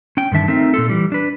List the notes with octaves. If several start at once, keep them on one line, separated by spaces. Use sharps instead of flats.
C#4 G5
G2 D3 D#3 E5 A5
A3 C4 D#4 A#4 E5
A#2 A3 F4 A4
E3 G3
D4 B4